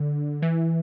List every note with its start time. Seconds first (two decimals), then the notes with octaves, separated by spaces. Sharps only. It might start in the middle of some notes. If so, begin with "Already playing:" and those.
Already playing: D3
0.42 E3